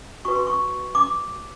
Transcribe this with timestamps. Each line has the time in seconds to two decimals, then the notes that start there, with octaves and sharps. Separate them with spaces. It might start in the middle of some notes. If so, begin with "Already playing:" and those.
0.25 F#4 B4 C#6
0.36 C6
0.47 C#6
0.95 D6